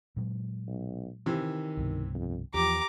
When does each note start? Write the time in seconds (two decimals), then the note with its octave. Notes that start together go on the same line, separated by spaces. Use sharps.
0.16 A#2 F#3 G#3
0.67 B1
1.26 C3 D#3 E3
1.77 C2 G2 B2
2.14 F2
2.54 E2 F3 G4 A#5 D6